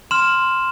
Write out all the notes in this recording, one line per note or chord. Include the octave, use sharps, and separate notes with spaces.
C6 F6 E7